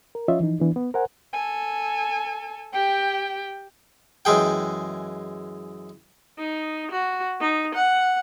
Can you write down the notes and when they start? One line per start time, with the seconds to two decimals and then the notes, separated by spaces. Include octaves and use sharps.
0.15 A#4
0.28 F3 C#4 F4 C#5 D#5 E5
0.40 E3 F3 D#4
0.60 E3 B3 D4 E4
0.76 B3
0.94 A#4 C5 F#5 G#5
1.33 A4 G#5
2.72 G4 G5
4.25 F#2 E3 G#3 G#4 G5
6.39 D#4
6.91 F#4
7.40 D#4
7.75 F#5